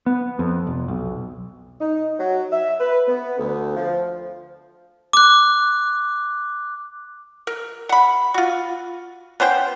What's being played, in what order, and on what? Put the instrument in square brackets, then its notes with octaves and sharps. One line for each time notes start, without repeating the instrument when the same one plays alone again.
[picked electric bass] B3
F2
F1
B1
[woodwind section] D#4
F#3
E5
B4
B3
D2
F3
[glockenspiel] D6 F#6
[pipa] A#4
F#5 B5
F4 F#4
B3 C#4 C5 G5